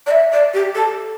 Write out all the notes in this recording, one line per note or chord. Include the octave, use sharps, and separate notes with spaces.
D5
E5
D5
G4
A4